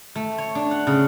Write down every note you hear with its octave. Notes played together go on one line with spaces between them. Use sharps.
A3
C#5
D4
F#5
C#3